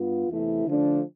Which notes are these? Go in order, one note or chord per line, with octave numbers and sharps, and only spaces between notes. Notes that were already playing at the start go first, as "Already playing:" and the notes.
Already playing: G2 B3 F4
E2 C3 E3 A3 E4
D3 F3 A3 D4